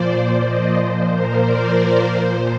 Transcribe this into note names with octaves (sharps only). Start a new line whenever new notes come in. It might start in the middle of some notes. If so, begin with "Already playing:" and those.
Already playing: A#2 F3 C5 D5
D#5
A#2 F3 C5
A#4
D5
A#2 F3 C5